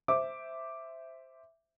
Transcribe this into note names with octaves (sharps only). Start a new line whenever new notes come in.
C5 E5 D6